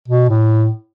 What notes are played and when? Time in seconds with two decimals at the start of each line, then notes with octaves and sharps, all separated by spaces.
0.08 B2
0.29 A2